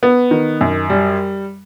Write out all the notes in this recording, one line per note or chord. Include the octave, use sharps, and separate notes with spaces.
B3
D#3
F#2
G3